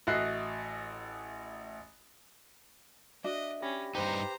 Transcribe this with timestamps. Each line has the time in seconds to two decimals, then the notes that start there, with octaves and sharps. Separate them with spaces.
0.07 A1 F#4 D#5 E5 F#6 C7
3.24 D4 F#4 D#5 E5
3.62 C#4 G4 B5 A#6
3.95 G2 D#4 G4 B4 C5 A#5